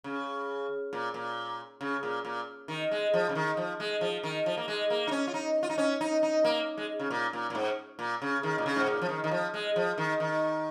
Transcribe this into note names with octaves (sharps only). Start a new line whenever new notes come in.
C#3
A#2
A#2
C#3
A#2
A#2
D#3
G#3
F3
C#3
D#3
F3
G#3
F3
D#3
F3
A#3
G#3
A#3
D#4
C#4
F4
D#4
F4
D#4
C#4
D#4
D#4
A#3
G#3
C#3
A#2
A#2
A#2
G#2
A#2
C#3
D#3
A#2
C#3
G#2
A#2
F3
D#3
D#3
F3
G#3
F3
D#3
D#3